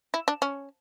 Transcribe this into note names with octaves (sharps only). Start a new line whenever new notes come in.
E4
D4
C#4